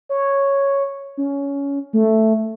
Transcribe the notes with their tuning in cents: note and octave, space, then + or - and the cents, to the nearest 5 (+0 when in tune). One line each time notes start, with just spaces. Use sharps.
C#5 -5
C#4 +15
A3 +0